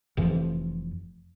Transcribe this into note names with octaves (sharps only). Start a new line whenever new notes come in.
F1 F2 E3 F3